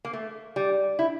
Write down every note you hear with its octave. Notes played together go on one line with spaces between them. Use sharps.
A#3
A3
G3
E4